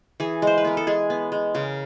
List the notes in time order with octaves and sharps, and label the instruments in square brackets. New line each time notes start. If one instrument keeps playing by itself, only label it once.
[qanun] E3 G#4
G#3 C5
B4
B3 A#4
A4
G#3 G#4
B3
G#3
C#3 A#4